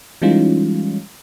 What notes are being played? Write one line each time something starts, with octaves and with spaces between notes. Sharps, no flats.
E3 G3 G#3 C#4 D#4 F4